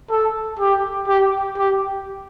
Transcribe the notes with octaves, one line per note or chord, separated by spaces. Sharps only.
A4
G4
G4
G4